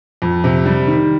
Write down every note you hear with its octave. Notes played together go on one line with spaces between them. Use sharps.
F2
C3
G3
D#3